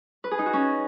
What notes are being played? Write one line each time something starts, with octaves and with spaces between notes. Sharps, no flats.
B4
G#4
D#4
F#4
C#4